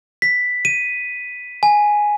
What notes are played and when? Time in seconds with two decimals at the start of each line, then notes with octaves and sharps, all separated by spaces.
0.22 B6
0.65 D#7
1.63 G#5